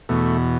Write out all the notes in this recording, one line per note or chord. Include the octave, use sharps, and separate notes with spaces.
E2 B2 A3